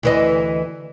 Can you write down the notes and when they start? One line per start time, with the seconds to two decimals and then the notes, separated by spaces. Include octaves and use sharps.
0.03 D2 E3 D#5